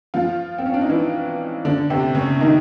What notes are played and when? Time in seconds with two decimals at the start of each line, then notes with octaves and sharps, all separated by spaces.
0.14 F3 F4
0.58 C4
0.66 C#4
0.74 D4
0.81 D#4
0.90 E3 E4
1.65 D3 D4
1.90 C3 C4
2.15 C#3 C#4
2.40 D#3 D#4